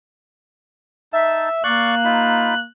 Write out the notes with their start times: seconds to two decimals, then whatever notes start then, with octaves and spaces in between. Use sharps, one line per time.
1.13 D#4 E5 A5
1.64 A#3 D5 F5 C#6 F#6
2.05 D#4 F4 B5